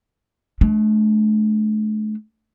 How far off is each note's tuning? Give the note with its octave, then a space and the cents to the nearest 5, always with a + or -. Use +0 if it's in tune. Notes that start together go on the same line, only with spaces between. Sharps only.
A3 -45 D4 -10